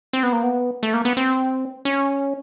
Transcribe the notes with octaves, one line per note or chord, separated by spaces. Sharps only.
C4
B3
A#3
B3
A3
A#3
B3
C4
C#4